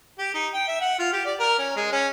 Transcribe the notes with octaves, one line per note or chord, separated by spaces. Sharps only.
G4
D#4
G5
E5
F#5
F4
G4
D5
A#4
C#4
G#3
C#4